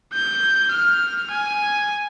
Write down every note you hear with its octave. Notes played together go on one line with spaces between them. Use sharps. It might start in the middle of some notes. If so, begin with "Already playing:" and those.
G6
F6
G#5